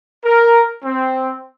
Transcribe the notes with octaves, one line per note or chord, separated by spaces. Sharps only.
A#4
C4